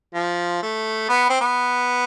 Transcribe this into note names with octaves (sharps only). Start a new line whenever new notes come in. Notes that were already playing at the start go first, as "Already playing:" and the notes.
F3
A3
B3
C4
B3